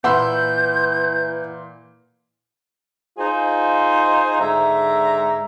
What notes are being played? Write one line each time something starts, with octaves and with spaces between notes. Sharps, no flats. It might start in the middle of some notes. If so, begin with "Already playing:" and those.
A#2 E3 F#5 B5 C6 E6 G6
D#4 F4 G#4 C5
G#2 D3 E5 A#5